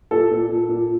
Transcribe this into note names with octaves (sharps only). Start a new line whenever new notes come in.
A#2 A4
A#2
A#2
A#2